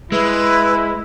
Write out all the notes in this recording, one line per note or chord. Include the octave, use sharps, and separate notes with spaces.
G#3 E4 B4